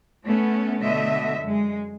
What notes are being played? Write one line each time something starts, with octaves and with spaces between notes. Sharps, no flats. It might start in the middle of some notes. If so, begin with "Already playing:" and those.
A3 B3 C#4
B2 D3 A3 D#5 E5
F#2 G#3